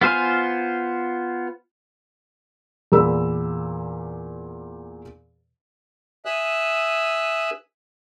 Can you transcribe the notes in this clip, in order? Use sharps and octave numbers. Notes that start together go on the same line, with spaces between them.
B3 F4 C5 G#5 F6
E2 A#2 B5 E6
E5 G#5 D#6 E6 F#6